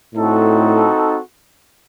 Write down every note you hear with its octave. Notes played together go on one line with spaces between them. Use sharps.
A2 C4 D#4 F#4 A4